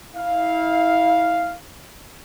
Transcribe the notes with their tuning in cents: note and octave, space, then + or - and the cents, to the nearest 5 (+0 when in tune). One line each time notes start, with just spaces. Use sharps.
E4 -30 F5 +0